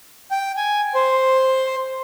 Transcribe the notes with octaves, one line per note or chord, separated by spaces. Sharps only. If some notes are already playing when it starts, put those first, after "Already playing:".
G5
G#5
C5